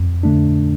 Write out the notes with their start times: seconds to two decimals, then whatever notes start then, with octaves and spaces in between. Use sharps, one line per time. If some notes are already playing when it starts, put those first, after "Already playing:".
Already playing: F2
0.23 D3 A3 D4